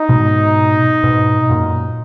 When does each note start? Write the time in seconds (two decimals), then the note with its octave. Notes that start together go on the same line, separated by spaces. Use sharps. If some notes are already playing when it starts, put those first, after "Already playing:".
Already playing: D#4
0.09 G#2 B2
1.03 G#2 B2
1.49 F#2 A#2